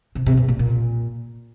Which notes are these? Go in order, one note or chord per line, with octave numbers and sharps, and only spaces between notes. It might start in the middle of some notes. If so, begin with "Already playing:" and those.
C3
C3
B2
A#2
A#2